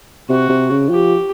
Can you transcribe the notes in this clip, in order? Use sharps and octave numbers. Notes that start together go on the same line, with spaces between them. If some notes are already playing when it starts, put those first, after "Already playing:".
C3 F#4
C3
C#3
F3 G4